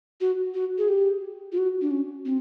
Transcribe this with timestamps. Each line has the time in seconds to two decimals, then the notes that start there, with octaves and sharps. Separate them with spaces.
0.21 F#4
0.54 F#4
0.78 G#4
0.88 G4
1.52 F4
1.58 F#4
1.81 D4
1.91 C#4
2.26 C4